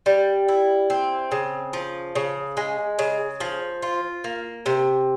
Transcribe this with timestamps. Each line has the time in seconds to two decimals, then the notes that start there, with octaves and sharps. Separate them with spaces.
0.06 G3
0.48 E4
0.90 C4
1.31 C#3
1.73 F3
2.16 C#3
2.57 G#3
2.99 C#3
3.40 F3
3.82 F4
4.24 A#3
4.66 C3